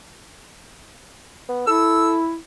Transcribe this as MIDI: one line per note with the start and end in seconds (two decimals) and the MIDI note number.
1.49 1.65 59
1.67 2.37 64
1.67 2.18 69
1.67 2.15 88